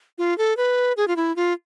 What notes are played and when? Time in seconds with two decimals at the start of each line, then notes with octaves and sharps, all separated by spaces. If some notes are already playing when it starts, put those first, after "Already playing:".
0.18 F4
0.38 A4
0.57 B4
0.97 G#4
1.08 F4
1.16 E4
1.36 F4